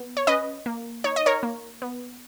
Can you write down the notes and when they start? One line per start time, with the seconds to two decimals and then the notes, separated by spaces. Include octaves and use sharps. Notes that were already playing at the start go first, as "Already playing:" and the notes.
Already playing: B3
0.17 C#5
0.27 C#4 B4 D#5
0.66 A#3
1.04 D#4 C#5
1.16 D#5
1.26 A#4 C#5
1.43 A#3
1.82 B3